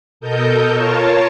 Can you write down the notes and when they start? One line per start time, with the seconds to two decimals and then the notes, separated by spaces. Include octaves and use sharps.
0.21 B2 A4 A#4 D#5 G6
0.71 F4 A#4 C#5 A5 C#6